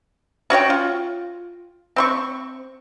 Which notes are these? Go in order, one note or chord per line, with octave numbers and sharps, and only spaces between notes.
C#4 F#4 C#5 G5
F4
C4 C6 C#6